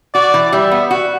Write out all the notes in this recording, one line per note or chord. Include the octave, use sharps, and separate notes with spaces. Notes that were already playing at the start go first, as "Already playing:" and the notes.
F#4 D5
E3
G3 E5
B3
F#4